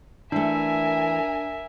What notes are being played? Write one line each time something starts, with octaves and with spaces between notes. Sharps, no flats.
E3 A3 D4 A#4 E5 G#5